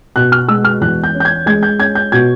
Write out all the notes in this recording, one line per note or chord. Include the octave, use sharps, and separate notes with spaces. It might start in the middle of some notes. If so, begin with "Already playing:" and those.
B2 F#6
F6
G#3 E6
F6
E2 F#6
G6
C#4
G6
G#6
G#3 G#6
G6
C#4 G#6
G6
B2 G#6